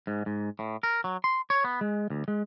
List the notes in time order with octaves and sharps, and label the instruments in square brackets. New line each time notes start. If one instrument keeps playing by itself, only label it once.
[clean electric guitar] G#2
G#2
A2
A#4
F#3
C6
C#5
B3
G#3
D2
G#3